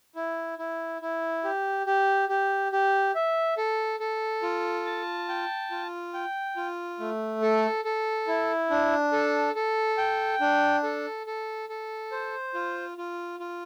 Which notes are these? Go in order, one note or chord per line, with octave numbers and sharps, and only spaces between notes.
E4
E4
E4
G4
G4
G4
G4
E5
A4
A4
F4
A5
G5
F4
G5
F4
A3
A4
A4
E4
D4
A4
A4
G5
D4
A4
A4
A4
C5
F4
F4
F4